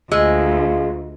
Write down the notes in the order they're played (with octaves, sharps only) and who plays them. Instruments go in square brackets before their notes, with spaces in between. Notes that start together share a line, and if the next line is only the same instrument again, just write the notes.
[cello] D2 [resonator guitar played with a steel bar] G#3 [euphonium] F4 [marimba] D#5 E6